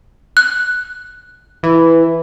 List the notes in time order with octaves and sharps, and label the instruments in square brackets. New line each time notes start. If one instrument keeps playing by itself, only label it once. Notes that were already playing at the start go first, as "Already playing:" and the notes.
[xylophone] F#6
[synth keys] E3